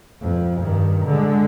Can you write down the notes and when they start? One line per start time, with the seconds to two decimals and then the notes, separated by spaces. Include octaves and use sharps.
0.21 F2
0.61 G2 D#3
1.05 D3 G#3